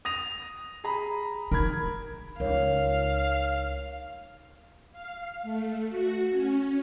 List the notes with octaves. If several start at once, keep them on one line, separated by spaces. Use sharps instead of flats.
D#6 A#6 F7
G#4 A#5 B5
D#4 A#4 B5 G#6
C#2 D#4 A#4 C#5 F5
F5
A3
F#4
C#4